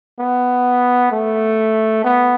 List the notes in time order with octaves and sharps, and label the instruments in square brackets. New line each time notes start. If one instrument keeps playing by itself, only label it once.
[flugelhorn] B3
A3
B3